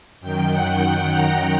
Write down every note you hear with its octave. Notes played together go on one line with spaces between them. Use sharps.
F#2 D#3 G5
F#5
G5
A#5